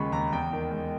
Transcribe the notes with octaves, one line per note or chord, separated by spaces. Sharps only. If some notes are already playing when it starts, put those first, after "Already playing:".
Already playing: D#2 C#3 G#3 B5 C#6
D#2 A#5
E2 G5
D#3
G#3